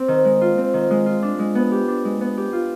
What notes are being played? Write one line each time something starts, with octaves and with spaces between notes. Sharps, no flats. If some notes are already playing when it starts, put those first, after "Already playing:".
Already playing: C4
D#3
G#3
F4
C4
D#3
G#3
F4
D4
G#3
B3
G4
D4
G#3
B3
G4
F4